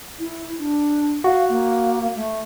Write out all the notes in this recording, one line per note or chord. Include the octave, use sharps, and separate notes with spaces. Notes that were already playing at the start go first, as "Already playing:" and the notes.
E4
D4
F#4 F5
A#3
A3